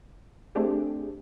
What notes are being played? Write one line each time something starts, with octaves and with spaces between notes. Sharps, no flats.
A3 C4 D4 G4 G#4